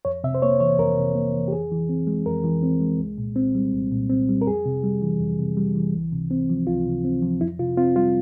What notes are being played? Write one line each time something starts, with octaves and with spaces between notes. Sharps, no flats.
F2 C#5
C3 E5
C5
A#3 C#5
E3 C#5
F2 A#4
C3
A#3
E3
G4
F2 G#4
E3
C4
G#3
F2 A#4
E3
C4
G#3
C2
A#2
C4
G3
C2
A#2
C4
G3
A#4
F2 G#4
C3
G3
E3
F2
C3
G3
E3
C#2
C3
C4
F3
C#2 F4
C3
C4
F3
F2 E4
C3 F4
C4 F4
G3 F4